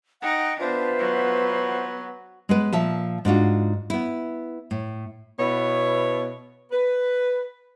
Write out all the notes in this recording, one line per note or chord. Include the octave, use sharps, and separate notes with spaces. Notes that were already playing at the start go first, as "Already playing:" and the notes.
D#4 F#5 G5 F#6
B3 D4 F4 B4 C5 E5
F#3
G#3 B3 B4
A#2 F3 E5 A5
G#2 D4 F4 F#4
B3 E4
A2
B2 B3 E4 C#5
B4